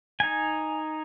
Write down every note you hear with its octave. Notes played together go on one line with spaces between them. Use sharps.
D#4 G#5